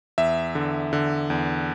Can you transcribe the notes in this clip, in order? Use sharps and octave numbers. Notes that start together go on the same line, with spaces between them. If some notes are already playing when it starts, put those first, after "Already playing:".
E2 E5
D3
D3
E2